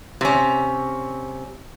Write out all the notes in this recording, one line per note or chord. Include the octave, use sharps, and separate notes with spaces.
C3 C#4